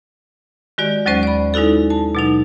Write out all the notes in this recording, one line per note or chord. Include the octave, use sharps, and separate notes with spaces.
D#3 G#3 F#4 G4 D5
D#2 F#3 G#3 C#4 C5
D5 B5
G#3 D#4 E4 F#4 A4
A5
B2 F#3 D#4